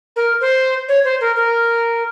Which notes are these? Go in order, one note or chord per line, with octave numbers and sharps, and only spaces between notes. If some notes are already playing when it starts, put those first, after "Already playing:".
A#4
C5
C#5
C5
A#4
A#4